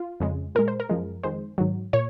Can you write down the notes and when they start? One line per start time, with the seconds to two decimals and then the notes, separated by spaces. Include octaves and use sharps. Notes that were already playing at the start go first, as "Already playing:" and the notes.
Already playing: F4
0.20 F2 C#3 G#3
0.55 A#2 G#3 A#4
0.68 C5
0.80 A#4
0.89 F#2 F3 G#3
1.23 F2 D#3 G#3 C5
1.58 G#2 D#3 F#3
1.93 A#2 C#5